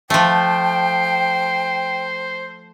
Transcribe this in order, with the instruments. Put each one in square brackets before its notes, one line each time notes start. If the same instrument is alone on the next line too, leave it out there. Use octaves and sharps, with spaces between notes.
[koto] F3 A3 [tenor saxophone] C5 [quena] G5